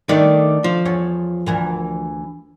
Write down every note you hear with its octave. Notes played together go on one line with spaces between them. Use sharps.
D#3 A3 D4 D5
F3
E2 C#5
D2 E3 A#4